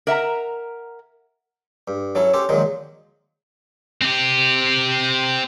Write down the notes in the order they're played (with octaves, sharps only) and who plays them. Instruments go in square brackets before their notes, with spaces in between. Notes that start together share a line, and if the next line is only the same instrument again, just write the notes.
[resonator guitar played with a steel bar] A#4 E5 F#5 A#5
[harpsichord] G2
F#3 C#4 E4 A4
C#4 G4 A4 C5
A#2 D#3 F3 F#3 G#3
[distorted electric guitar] C4 G4